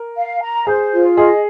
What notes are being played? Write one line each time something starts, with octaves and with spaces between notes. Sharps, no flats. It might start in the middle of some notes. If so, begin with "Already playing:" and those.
Already playing: A#4
F5
A#5
G#4 C5
F4
G#4 D#5